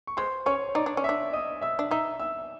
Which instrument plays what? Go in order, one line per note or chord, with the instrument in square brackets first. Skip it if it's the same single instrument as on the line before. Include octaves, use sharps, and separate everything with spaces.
[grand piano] C#6
[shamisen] G#3 [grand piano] C5 C6
[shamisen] C#4 [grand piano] C#5 C#6
[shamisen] D#4 [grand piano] D5 D6
[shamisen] D4
C#4
[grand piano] E5 E6
[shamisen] D4
[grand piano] D#5 D#6
E5 E6
[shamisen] D4
[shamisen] D#4 [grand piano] E5 E6
[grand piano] E5 E6